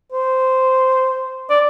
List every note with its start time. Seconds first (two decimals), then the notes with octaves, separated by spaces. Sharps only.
0.12 C5
1.50 D5